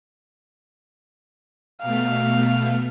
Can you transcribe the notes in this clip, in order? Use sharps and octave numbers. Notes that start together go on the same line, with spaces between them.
B2 A3 F5